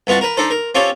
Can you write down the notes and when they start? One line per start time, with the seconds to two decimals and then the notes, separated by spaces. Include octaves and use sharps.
0.07 C2 B3 F4 F#4 A5
0.21 A#4 B4
0.37 D4 D#4 A4 C5
0.51 A#4
0.75 C4 C#4 F4 G4 A4 C#5